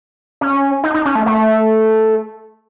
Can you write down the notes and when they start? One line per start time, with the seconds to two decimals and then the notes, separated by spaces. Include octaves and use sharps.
0.41 C#4
0.84 D#4
0.94 D#4
1.05 C#4
1.15 A3
1.26 A3